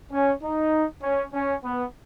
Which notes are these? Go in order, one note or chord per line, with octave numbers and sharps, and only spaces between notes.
C#4
D#4
C#4
C#4
B3